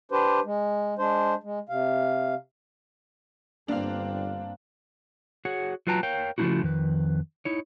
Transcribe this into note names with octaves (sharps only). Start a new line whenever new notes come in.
D4 G4 B4 C5
G#3
G#3 D4 C5
G#3
C3 F5
G1 G2 A#3 C4 D4 F5
F#4 G#4 C#5 F#5
F#3 F4 B4 G5 A5 A#5
A#4 C#5 F5 G5
C#3 F3 A3 D#4 E4 F#4
F2 D#3 B4
D#4 E4 C#5